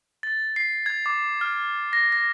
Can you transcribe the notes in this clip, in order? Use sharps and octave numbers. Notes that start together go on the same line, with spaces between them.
A6
C7
G#6
D6
F6
A#6
A#6